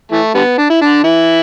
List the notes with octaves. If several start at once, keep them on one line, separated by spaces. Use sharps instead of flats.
E3 A3
D3 G3 B3
D4
E4
D3 D4
E3 E4